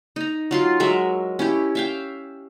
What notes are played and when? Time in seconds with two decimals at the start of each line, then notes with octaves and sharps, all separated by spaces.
0.16 D#4 A#5
0.51 F#3 F4 C6
0.80 F#3 G#3 A#4 E5
1.39 C#4 E4 G4
1.75 E5 F5 G5